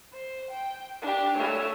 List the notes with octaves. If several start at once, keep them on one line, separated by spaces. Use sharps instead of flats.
C5
G5
D4 G4
A3 C#5